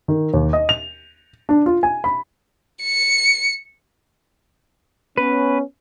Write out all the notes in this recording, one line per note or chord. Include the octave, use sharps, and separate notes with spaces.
D#3
D#2
D#5
F7
D4
F4
G#5
B5
C#7
B3 C#4 B4